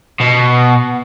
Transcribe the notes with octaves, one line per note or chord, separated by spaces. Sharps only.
B2